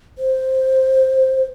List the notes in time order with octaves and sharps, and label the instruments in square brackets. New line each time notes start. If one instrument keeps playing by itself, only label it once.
[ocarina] C5